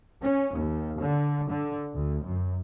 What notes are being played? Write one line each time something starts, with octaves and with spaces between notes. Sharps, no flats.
C#4
D#2
D3
D3
D2
F#2